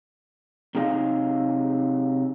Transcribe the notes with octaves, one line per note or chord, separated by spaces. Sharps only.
C3 F#3 D#4 G#4 D#5 F5